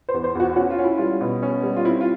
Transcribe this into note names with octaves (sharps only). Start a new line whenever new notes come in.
C5
E2
C5
E2 F#4
C#4 F#4
F4
C#4
E4
G3 F4
B2
C#4
G3
F4
C4 E4
F4